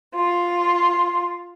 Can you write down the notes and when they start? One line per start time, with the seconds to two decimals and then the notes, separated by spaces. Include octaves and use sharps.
0.15 F4